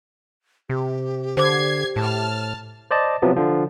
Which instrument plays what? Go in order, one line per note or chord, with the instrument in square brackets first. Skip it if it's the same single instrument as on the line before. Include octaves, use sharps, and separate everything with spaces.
[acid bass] C3 [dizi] G4
[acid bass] D3 [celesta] C5 D6 [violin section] G#6 C7
[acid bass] A2 [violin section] A5 F6
[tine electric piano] C5 D5 D#5 A5
C3 F3 F#3 B3
D3 F3